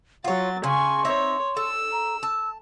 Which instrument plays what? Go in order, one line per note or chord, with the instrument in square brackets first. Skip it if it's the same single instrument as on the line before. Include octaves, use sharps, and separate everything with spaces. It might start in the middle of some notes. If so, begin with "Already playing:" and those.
[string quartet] F#3 A6 [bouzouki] F4 C#5 [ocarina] F#5
[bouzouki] C#3 [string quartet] G#5 C#6 [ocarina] C6
[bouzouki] C4 D#4 E5 [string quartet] C#5
[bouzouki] A4 [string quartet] E6
[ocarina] A#5
[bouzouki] A5 [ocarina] E6